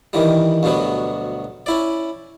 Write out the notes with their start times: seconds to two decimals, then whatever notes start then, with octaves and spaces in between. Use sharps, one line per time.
0.13 D#3 E3 G3
0.63 D2 G2 B2 F#3 B3
1.66 C#4 E4 D5